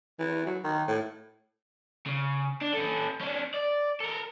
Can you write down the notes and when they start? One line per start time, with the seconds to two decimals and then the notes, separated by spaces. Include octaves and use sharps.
0.19 E3
0.46 F#3
0.64 D#3
0.88 A2
2.06 C#3
2.61 D4
2.73 C#4 A4
3.21 C#4 D4
3.54 D5
4.00 A4 A#4